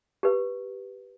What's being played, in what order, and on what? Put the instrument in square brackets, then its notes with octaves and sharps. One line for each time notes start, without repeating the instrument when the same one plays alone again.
[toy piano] G4 B4